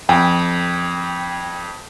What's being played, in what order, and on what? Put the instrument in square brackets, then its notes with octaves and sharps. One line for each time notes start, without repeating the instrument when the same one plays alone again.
[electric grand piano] F2 [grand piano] G5